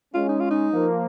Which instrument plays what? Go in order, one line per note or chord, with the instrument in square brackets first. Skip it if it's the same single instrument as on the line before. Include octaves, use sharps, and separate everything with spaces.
[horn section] G#3 C#4 [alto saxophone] F4
[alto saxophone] D#4
F4
D#4
[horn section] F3 A#3